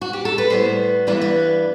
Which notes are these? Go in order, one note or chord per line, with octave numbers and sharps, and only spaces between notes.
F#4
G4
A4
B4
A2 G3 B3 C5
G2 E3 G3 B3 B4
B4